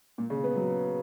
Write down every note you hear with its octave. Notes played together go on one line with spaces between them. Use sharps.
A#2
C#3
B3
F#3